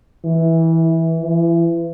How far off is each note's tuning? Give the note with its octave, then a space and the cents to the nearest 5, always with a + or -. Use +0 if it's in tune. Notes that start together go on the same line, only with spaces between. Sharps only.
E3 -15
E3 +30